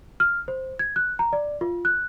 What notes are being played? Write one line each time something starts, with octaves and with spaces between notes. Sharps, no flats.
F6
C5
G#6
F#6
A#5
D5
F4
F#6